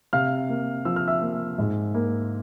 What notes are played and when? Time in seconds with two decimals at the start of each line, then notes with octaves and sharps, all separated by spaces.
0.13 C3 F5 F6
0.49 A#3
0.85 F3 E6
0.96 F6
1.07 E5 E6
1.21 A#3
1.58 G#2
1.94 A#3